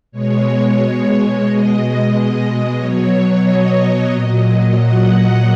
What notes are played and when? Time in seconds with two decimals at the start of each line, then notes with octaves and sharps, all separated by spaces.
0.12 B2 G#3 C#5
1.44 B2 G#3 D#5
2.76 B2 F#3 C#5
3.43 D#5
4.09 A#2 F#3
4.75 F#5